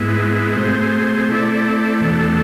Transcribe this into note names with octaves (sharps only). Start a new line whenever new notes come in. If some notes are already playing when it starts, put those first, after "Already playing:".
Already playing: G#2 G#3 B3 E4
B2 A3 C4 G#4 C5
A3 C4 E4 A4 D5
E2 B2 A3 D4 A4